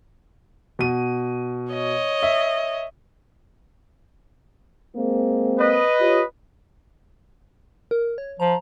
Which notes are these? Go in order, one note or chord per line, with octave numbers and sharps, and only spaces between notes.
B2 D#7
C#5 D#5
E5
G#3 A#3 C4
B4 D#5
F4 G4 C#5
A#4
C#5
F3 A#5